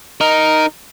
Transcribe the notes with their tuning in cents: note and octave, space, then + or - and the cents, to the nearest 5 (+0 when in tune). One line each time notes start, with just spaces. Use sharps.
D#4 +0 A#4 +0